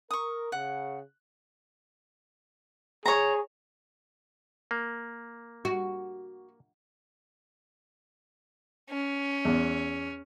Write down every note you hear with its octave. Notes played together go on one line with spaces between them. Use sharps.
A#4 C#6 D#6
C#3 F#5
G#4 C#5 A#5
A#3
F#4
C#4
E2